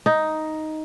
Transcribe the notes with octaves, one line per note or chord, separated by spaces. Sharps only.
D#4